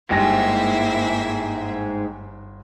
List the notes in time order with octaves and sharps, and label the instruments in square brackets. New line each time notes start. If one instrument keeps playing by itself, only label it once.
[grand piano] G1 G3 A#6 [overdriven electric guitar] G#2 [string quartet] A#3 E4 E5 [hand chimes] G5